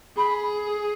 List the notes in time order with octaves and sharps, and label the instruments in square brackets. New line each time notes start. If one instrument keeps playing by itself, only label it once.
[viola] G#4 [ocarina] B5